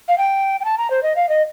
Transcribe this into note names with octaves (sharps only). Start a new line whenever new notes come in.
F5
G5
G5
A5
A#5
C5
D#5
F5
D#5